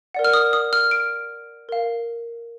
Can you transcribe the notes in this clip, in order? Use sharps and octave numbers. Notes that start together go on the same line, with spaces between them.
A#4 D5 F#5
F6
D#6
D#6
F6
D7
A#4 F5